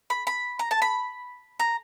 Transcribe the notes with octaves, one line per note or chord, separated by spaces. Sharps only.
B5
B5
A#5
A5
B5
A#5